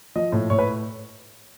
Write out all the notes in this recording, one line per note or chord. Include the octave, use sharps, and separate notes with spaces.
F3 D#5
A2
A2 C#5
B4